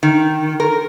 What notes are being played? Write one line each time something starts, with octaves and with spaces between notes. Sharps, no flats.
D#3
A#4